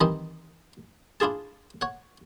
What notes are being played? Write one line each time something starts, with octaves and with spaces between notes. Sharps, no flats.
D#3 E3 G3 C4 D#5
D4 E4 F4 G#4 A5
C#5 F#5